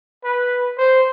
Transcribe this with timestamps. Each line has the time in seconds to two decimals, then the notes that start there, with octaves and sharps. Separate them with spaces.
0.24 B4
0.78 C5